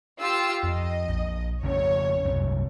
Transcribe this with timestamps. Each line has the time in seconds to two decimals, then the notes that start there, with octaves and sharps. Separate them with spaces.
0.19 F4 G4 E6
0.64 F2 D#5
1.08 A#1
1.63 F2 C#3 C#4 C#5
2.25 C2 F#2 C3